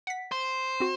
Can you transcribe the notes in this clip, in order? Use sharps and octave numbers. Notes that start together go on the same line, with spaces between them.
F#5 B6
C5
C4 F#4